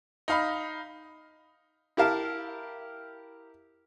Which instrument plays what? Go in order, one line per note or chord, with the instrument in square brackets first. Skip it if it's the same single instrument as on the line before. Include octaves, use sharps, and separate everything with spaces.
[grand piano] D#4 F5 B5
[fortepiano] E4 G4 A#4 F5 A5